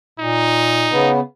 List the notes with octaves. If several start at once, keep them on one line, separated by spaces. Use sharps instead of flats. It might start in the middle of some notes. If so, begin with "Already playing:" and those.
A#2 D#4
C#3 B3